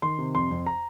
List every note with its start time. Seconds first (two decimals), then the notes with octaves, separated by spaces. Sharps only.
0.02 D#3 C6
0.19 C3
0.35 F2 C6
0.51 F2
0.66 A#5